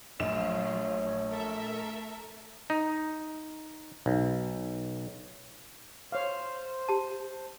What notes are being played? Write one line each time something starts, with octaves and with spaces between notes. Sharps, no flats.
A#1 F3 F#3 A3 F4 C#5 E7
A4 A#4 E5
D#4
B1
C5 C#5 F5
G4 A5